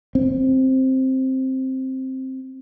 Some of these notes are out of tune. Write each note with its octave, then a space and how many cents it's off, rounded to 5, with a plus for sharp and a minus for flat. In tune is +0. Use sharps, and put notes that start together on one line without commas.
C4 +5